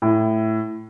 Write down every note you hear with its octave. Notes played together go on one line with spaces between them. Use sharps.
A2